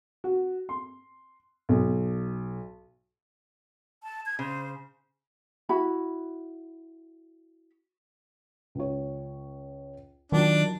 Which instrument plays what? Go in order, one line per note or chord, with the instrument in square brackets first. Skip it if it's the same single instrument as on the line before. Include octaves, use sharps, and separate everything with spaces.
[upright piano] F#4
C6
B1
[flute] A5
G#6
[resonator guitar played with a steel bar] C#3 [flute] C5
[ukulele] E4 F#4 B5
[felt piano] C#2 C#5
[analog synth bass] D#3 [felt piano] F#3 D#4 F4 [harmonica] D4